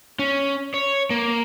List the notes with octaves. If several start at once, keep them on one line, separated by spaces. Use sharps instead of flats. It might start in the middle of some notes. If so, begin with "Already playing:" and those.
C#4
C#5
A#3